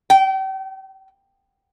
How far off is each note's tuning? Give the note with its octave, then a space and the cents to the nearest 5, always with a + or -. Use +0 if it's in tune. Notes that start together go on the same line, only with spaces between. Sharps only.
G5 -35